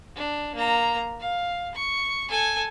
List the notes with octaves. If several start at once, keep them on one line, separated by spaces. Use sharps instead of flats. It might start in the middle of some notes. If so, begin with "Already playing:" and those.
D4
A#3 A#5
F5
C#6
A4 G#5